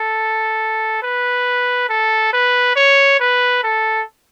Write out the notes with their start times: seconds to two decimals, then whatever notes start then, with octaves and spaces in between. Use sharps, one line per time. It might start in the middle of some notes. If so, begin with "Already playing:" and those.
Already playing: A4
1.03 B4
1.90 A4
2.33 B4
2.76 C#5
3.20 B4
3.63 A4